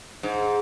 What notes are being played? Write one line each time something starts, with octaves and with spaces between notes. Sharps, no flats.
G#2